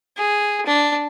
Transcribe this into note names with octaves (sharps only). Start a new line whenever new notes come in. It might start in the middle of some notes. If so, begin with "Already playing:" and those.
G#4
D4